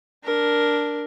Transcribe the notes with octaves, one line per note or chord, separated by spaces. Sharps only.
D4 A#4